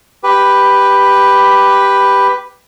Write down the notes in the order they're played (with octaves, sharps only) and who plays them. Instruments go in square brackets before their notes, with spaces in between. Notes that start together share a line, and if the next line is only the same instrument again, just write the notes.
[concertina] G4 B4